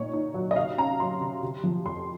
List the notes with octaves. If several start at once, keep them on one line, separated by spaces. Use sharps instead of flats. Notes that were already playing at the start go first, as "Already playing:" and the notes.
Already playing: A#2 D#4 C#5
D#4
F#3
D#5
C3 F5
C#4 A#5
F#3 C6
C3
C3
F3
F2 C6